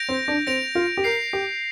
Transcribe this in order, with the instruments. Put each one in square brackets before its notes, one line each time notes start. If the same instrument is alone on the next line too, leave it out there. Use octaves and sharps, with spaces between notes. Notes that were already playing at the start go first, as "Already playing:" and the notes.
Already playing: [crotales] G6 A#6 D7 F7
[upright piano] C4
D4
[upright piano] C4 [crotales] A#6 D7 F7
[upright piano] F4
G4
[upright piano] A#4 [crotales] G6 C7 F7
[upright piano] G4